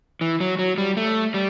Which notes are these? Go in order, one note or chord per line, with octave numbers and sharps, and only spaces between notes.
E3
F#3
F#3
G3
A3
G3